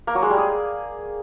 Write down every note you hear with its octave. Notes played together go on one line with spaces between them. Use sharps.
A#3
F#3
G#3
G3
G#4